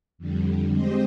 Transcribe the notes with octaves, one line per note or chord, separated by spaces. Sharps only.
F2 D3 G3
G#3 C4 G4 C5 D#5